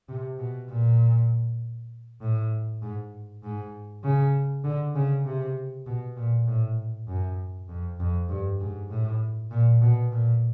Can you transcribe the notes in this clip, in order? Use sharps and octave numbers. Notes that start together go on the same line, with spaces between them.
C3
B2
A#2
A2
G#2
G#2
C#3
D3
C#3
C3
B2
A#2
A2
F#2
F2
F2
G2
G#2
A2
A#2
B2
A#2